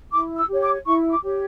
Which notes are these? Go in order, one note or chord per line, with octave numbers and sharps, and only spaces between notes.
E4 D6
E6
G4 C#5
D6
E4 C#6
D6
G4 C#5